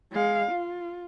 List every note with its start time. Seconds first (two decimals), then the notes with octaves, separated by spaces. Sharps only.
0.12 G#3 F5
0.51 F4